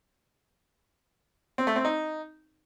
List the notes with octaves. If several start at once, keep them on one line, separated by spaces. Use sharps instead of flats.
C4
A3
C4
D#4